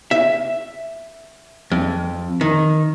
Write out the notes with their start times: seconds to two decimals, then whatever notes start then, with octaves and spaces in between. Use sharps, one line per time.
0.11 E5
1.72 F2
2.41 D#3